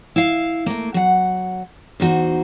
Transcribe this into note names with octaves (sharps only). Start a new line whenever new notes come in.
E4 F5
A3 A#3
F#3 F#5
E2 D#4 F#4 C5